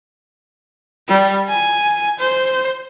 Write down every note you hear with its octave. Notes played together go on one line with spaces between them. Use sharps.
G3
G#5
C5